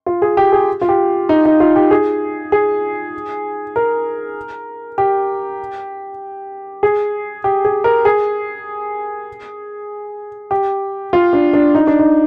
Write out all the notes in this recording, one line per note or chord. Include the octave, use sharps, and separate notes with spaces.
F4
G#4
G4
G#4
F4
G4
D#4
D#4
F4
G4
G#4
G#4
A#4
G4
G#4
G4
G#4
A#4
G#4
G4
F4
D4
D4
D#4
D4
D#4